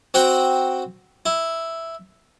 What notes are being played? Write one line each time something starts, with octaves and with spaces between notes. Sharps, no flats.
C4 F#4 F#5 G5
E4